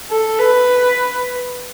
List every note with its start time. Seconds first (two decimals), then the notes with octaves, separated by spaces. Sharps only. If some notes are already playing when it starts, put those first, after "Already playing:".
0.10 A4
0.39 B4